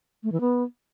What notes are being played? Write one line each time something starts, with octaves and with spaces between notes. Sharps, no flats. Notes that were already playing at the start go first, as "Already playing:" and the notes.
A3
E3
B3